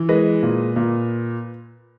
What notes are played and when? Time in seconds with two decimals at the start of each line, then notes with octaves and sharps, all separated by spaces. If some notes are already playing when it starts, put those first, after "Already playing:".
Already playing: E3
0.09 G#3 B4 D#5
0.43 A#2
0.76 A#2